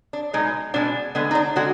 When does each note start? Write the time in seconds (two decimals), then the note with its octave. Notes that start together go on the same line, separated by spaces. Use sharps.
0.13 D4
0.33 B2 G#3 D#4
0.74 B2 G#3 D4
1.15 D3 G#3 B3
1.31 D#4
1.35 D4
1.56 D3 G#3 F#4